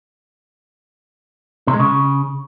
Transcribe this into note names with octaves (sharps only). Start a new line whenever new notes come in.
C3
G#3
C#3